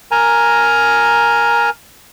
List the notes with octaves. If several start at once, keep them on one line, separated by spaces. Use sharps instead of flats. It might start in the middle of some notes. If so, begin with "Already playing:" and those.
A#4 G#5 A#5